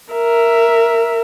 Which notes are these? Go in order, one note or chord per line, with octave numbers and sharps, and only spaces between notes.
A#4 E5